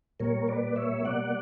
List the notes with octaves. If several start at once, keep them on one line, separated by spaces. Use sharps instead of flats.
A#2 G3 A#3 A#4 C#5
B4 D5
C#5 E5
B2 G3 A#3 D5 F#5